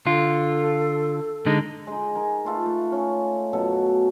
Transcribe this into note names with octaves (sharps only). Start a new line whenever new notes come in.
D3 F4 A4
D3 G#3 D#4
G#3 D#4
G#4 A#4 G#5
A3 F4 A4 B4
A3
C#4
F#2 B2 A4